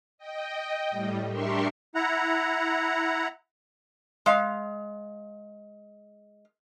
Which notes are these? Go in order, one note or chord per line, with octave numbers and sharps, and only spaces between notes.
D#5 G5
A2 G3
D4 G4 A#4 E5 C6 C#6
E4 F#5 A#5
G#3 F5